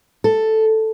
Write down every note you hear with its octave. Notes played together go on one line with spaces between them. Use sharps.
A4